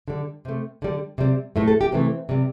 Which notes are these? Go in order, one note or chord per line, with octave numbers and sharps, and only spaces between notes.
D3 G3
C3 A3
D3 G3
C3 G3
A2 A3
A4
G4
C3 E3 A3 C4
C3 G3